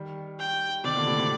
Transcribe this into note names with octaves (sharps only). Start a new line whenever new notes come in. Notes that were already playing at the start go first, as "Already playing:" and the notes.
Already playing: D#3 G3
G5
C3 D#3 D5
A#2 D3
A2 C3
A2 C3